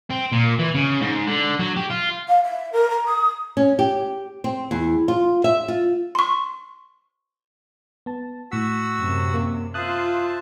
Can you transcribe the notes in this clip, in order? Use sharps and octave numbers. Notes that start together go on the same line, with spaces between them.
C4
A#2
E3
C#3
G#2
D3
F#3
G4
F4
F5
E5
A#4
A#5
D#6
C#4
G4
C4
E2
F4
E5
F4
C6 C#6
B3 A5
A2 F#4 F#5 E6 B6
F#2 C3
A#3
F4 C5 E5 A5 D#6 F#6